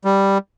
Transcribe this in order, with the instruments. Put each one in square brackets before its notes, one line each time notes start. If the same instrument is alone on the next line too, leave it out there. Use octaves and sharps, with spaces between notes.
[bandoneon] G3